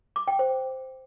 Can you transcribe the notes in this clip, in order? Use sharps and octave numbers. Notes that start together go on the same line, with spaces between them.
D6
G5
C5